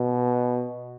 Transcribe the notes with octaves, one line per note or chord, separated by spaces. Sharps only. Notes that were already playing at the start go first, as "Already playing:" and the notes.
Already playing: B2